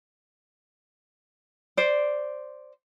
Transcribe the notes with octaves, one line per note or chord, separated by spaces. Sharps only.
C5 D5